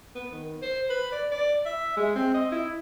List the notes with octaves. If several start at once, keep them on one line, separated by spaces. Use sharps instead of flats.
B3
D#3
C5
B4
D5
D5
E5
G#3
C4
D#5
E4